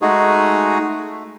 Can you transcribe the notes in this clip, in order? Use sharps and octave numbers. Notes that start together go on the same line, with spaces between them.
G#3 A3 D#4 F#4 G#4
A3